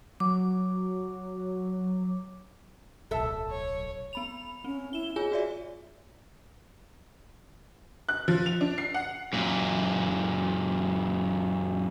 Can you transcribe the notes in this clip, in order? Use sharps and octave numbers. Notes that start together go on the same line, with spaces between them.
F#3 D6
D1 B1 A4 E5
C#5
B3 B5 F7
C4 C#4
E4 E7 G7
F4 G#4 C#5 G#5
F#4 D5 E5
F#6
F3
F7
D4
C7
F#5
F#2 A#2